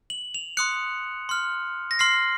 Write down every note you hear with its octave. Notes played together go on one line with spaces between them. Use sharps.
F#7
F7
C6 D#6 F#6 C#7
C6 F6
A#6
C6 F6 C7